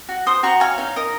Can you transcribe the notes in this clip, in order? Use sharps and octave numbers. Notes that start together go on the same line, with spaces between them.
F#4
C5 C6 D#6
F#4 A#5 C#6
C#5 F5 G#5
D#4 F5
A#4 D#5